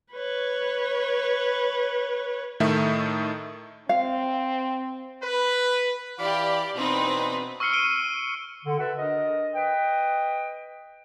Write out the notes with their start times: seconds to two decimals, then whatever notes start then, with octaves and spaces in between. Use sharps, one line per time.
0.13 B4 C#5
2.60 A2 D#3 A3 E5
3.89 C4 F5
5.23 B4
6.18 E3 G4 D5 F5 B5
6.75 B2 E3 C4 D4 D#4 B4
7.60 C#6 E6 F6 C7 C#7 G7
7.72 C#6 D7 D#7 G7
8.65 D3
8.78 F#4 A4 B4 E5 F#5
8.98 D4 A#4 D#5
9.54 B4 D#5 G5